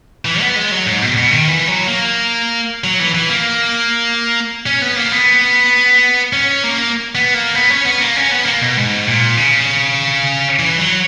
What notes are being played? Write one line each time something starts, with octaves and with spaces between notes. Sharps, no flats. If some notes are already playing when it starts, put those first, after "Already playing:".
E3
B3
G#3
F#3
G#2
B2
B2
D#3
E3
F#3
A#3
F#3
E3
E3
A#3
C#4
B3
A#3
B3
C#4
A#3
B3
A#3
B3
C#4
B3
A#3
C#4
B3
A#3
B2
G#2
A#2
C#3
E3
F#3